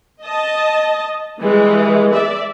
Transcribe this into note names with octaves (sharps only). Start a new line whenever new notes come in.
D#5 A5
E3 G3 G#3
D5 E5